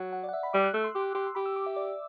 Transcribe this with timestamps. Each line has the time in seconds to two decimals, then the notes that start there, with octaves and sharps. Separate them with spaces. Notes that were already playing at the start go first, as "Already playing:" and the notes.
Already playing: F#3 F#5
0.13 F#5
0.23 D5
0.29 F#5
0.33 E5
0.43 B5
0.53 G3 D6
0.64 F#6
0.74 A3 E6
0.84 C6
0.95 G4 D6
1.14 G4 C6
1.27 C6
1.35 G4 B5
1.46 E6
1.56 D6
1.66 E5
1.76 D5